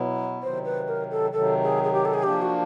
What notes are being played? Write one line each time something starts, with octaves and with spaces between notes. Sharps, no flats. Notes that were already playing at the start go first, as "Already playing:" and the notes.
Already playing: B2 F#3 B3 E4
C3 D#3 F#3 C5
B4
A#4
A4
C3 D#3 F#3 A4
G#4
G#4
G4
A4
G#4
F3 A#3 D4 G4
F#4